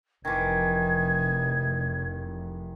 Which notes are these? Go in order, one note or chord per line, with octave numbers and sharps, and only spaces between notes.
F1 D#3 E3 G#6